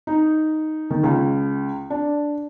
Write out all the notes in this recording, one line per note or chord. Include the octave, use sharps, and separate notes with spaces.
D#4
D#3
C#2
D4